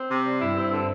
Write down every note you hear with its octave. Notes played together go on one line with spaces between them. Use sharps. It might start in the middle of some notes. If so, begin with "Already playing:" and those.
Already playing: C4
C3
G3
G2 E4
C4
D3